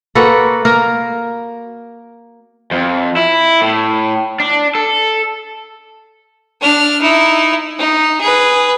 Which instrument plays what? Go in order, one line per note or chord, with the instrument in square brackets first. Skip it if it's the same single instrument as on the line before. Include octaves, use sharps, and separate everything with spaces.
[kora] A#3 F#4 A4 B4
A#3 A#4
[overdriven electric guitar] F2
E4
A2
D4
A4
[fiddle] D4 F6
D#4 E4
D#4
G#4 B4